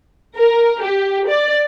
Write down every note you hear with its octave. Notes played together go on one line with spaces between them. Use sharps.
A#4
G4
D5